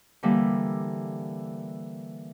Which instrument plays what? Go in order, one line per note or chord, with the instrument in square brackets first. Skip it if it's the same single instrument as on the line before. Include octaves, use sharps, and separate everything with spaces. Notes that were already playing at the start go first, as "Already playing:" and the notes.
[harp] D3 E3 G3 A#3